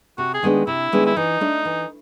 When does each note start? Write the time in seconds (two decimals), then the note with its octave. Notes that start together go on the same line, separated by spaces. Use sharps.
0.18 C3 F#4
0.34 G#4
0.43 D#3 G#3 B3 D4
0.67 C3 E4
0.92 D#3 G#3 B3 D4
1.06 E4
1.16 E3 D#4
1.41 A3 D4
1.65 E3